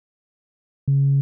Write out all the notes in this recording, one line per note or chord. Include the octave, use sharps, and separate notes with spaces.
C#3